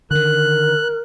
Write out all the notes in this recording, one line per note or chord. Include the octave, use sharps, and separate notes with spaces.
D3 D#3 A#4 F#6